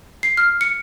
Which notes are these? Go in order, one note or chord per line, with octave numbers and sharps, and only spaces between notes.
C7
F6
C#7